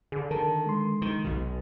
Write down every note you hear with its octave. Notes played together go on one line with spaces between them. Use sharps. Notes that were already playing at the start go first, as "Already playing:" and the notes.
D3 G#4
D#3 A#4 A5
G#3 C6
D#3
B1 B2